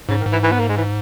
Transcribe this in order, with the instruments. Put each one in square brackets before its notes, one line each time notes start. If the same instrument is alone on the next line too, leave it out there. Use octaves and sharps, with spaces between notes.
[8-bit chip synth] G#2 [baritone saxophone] C#3
[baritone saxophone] D#3
[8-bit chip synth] G#2
[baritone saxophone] E3
E3
B3
A#3
G#3
E3